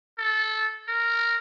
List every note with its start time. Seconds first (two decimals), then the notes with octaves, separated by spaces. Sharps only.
0.18 A4
0.88 A#4